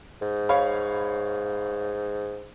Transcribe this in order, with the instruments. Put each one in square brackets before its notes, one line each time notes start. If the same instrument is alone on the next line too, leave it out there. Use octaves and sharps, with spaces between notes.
[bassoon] G#2
[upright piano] C#5 F5 B5